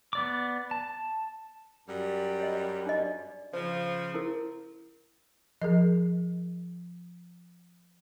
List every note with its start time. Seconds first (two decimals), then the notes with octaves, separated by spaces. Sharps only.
0.13 B3 D5 D6
0.71 A5
1.87 F#2 G3
2.40 C#5 D#5
2.86 D4 D#5
3.00 D5
3.53 C#3 F3 C5
4.14 E4 A#4
5.62 F3 G#4 A#4 D#5